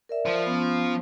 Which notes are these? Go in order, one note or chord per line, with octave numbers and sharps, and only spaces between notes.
A#4 D5 E5
F3
B3 C#4